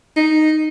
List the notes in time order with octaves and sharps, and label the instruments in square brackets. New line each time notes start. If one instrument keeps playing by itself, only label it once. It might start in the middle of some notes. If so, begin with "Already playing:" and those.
[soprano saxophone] D#4